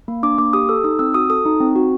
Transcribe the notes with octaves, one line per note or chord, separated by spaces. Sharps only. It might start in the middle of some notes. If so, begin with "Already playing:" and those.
A#3
D4 D6
A#3 D6
G4 D#6
A4 E6
D#4 D#6
C4 E6
F#4 D#6
A4 D#6
D#4
C4
F#4